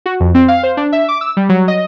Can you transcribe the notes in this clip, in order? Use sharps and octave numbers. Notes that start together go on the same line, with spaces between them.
F#4
F2
C4
F5
C5
D4
E5
D6
E6
G3
F#3
D#5